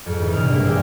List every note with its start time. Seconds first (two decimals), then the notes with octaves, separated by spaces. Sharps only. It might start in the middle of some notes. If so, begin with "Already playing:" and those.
0.06 F2 G#2
0.21 E3 B3 D#4
0.33 A#1 C3 F6
0.51 G2 E3 G#3 A#3
0.64 C5 D5 E5 F5 G5 G#5